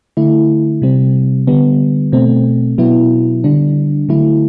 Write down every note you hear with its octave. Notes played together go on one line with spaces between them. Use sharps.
D3 A3 E4
C3 G3 C4
D3 G3 B3
B2 A3 C4
B2 F#3 B3 E4
D3 G3 D4
D3 F#3 A3 E4